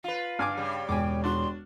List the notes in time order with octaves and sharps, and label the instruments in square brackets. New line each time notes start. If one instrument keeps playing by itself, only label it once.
[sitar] F4 B4 [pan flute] F5
[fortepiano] G2 G#5 D6 [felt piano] F6
[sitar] C#3 G3
[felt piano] E1 [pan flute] G5 [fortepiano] G#5 D6
[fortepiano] D4 F#4 [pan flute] C6